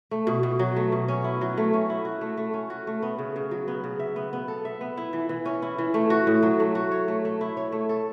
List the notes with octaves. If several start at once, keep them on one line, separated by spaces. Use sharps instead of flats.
A3
B2
B2
F#3
A3
B2
C#4
E4
F#3
A3
C#4
E4
F#4
A3
A3
C#4
F#4
A3
B3
C#3
C#3
F#3
B3
C#3
E5
B3
B3
A4
E5
B3
E4
E3
E3
C#4
E4
E3
A3
F#4
A2
F#3
A3
F#4
C#5
A3
A3
E4
C#5
A3
A4